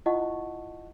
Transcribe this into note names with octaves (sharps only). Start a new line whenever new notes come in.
E4 F4 D#5 F#5 A5 C#6